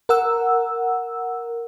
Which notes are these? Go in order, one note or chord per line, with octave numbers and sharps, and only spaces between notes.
A#4 F#5 E6